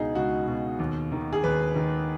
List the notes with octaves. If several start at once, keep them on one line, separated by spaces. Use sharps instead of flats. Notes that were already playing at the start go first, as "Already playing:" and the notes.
Already playing: C#2 B2 D#4 G#4
C#2 F#4
B2
D#2
D#3
G#4
D#2 B4
D#3